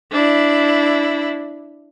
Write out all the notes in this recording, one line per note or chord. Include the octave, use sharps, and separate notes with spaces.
D4 E4